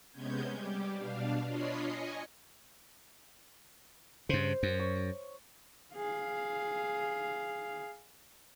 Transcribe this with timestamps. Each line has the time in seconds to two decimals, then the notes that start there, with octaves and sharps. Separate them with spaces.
0.11 C3 G#3 B3 C#4 G6 G#6
0.48 G3 G4
0.95 B2 D4 F5
1.44 D4 F4 C#5 D#5 B5 C7
1.80 D#5 G#5 C#6
4.29 G2 C#3 C5
4.63 F#2
4.80 C#5
5.94 G#4 F5